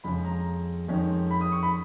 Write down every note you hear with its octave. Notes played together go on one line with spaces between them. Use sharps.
F2 C#3 G#3 C#4 B5
A#5
F2 D#3 G#3 C#4
B5
D#6
C#6
B5